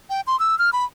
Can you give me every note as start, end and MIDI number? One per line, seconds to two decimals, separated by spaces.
0.10 0.21 79
0.27 0.38 84
0.40 0.57 88
0.59 0.70 89
0.73 0.85 83